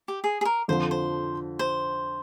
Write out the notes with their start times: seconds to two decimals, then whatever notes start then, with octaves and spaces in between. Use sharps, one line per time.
0.08 G4
0.24 G#4
0.41 G#4
0.45 A#4
0.68 F2 D3 F3 C5
0.91 C5
1.59 C5